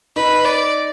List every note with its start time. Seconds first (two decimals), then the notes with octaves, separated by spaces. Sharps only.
0.16 D#4 B4
0.45 D5